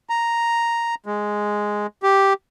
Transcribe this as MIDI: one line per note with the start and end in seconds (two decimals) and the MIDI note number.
0.09 0.95 82
1.06 1.87 56
2.03 2.33 67